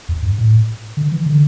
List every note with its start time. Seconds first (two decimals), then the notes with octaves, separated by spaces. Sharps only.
0.09 E2
0.23 G2
0.38 A2
0.97 D3
1.12 E3
1.26 D3